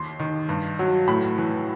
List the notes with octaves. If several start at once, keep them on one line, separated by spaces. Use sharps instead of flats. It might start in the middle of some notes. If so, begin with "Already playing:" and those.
Already playing: D#2 C6
D#3
G2
F#3
A2 B5
E3